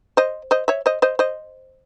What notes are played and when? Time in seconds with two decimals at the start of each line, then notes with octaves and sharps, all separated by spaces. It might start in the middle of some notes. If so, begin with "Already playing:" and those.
0.17 C5 D#5
0.51 C5 D#5
0.68 C#5 E5
0.86 C5 D#5
1.02 C5 D#5
1.19 C5 D#5